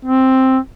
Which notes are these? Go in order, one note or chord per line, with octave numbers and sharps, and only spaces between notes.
C4